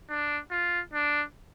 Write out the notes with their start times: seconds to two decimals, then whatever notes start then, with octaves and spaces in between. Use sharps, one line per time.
0.10 D4
0.51 F4
0.94 D4